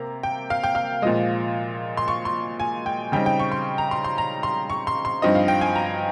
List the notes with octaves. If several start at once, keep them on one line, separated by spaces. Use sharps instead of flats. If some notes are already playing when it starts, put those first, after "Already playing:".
Already playing: C3 A#3 A#5
G5
F5
G5
F5
A#2 F3 G#3 D#5
C6
C#6
C6
G#5
G5
C#3 G3 C4 D#4 G5
G5
C#6
C6
A#5
C6
C6
A#5
C6
C#6
C6
C6
G2 F3 C4 D#4 D#5
F5
G5
G#5
A#5